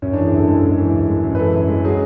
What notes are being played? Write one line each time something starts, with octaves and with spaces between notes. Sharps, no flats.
F#2 C#4
E3 D4
G#4
F#2 A4
G#3 A4
F#2
E3
F#2
G#3
F#2
B4
E3 A4
F#2
G#3
F#3 G#4